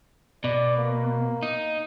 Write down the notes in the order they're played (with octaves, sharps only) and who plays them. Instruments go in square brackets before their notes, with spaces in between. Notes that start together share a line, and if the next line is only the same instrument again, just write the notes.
[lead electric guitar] B2 [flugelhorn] D5
[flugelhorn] A#3
[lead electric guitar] D#4